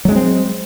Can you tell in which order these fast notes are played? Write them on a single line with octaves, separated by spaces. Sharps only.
F#3 G#3 C#4 C4